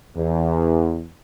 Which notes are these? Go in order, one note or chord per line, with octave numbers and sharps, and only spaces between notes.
E2